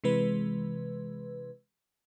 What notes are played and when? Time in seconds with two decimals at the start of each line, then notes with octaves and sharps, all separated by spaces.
0.04 C3 E3 G#3 B4